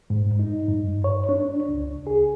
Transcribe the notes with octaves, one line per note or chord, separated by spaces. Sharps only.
G#2
D#4
G2
C#5
D4
C#2
G#4